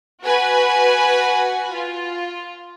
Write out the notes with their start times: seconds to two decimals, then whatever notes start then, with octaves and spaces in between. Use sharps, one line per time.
0.23 F#4 B4 G#5
1.73 F4